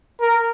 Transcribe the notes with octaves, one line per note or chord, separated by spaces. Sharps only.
A#4